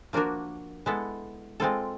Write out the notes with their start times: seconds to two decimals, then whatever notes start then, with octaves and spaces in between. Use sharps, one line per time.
0.13 F3 A#3 D4 F#4 A#4
0.86 G#3 B3 E4 A4
1.60 G#3 C4 F4 A4